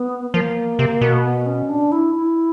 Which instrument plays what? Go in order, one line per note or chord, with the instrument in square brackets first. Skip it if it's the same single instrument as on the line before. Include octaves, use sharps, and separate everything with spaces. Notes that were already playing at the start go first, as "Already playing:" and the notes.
Already playing: [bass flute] B3
[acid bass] F3 [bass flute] A#3
[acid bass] C3
B2
[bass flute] B3
C#4
D4
E4
E4